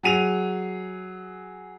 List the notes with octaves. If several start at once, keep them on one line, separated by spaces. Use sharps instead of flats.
F#3 G#4 D#7 F7